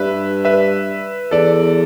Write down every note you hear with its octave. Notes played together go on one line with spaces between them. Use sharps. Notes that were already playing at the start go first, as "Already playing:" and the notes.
Already playing: G2 B4 E5
B4 E5
E2 A4 D5